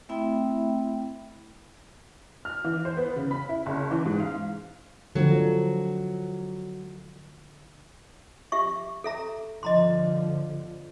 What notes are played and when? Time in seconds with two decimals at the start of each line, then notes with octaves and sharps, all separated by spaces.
0.09 A3 C4 E4 E5 G5 B5
2.45 F6
2.64 E3
2.85 C5
2.97 B3
3.16 C#3
3.31 B5
3.49 E4
3.66 F#1
3.91 E3
4.06 G#2
4.20 F5
5.15 D3 F3 F#3
8.52 G4 E5 C#6
9.04 A4 E5 A#5
9.63 G1 D3 F3 D#5 A#5 C6